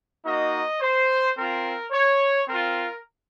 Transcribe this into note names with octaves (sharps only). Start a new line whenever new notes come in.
A#3 D#4 F#4 D#5
C5
C4 F4 A#4
C#5
C4 F4 A#4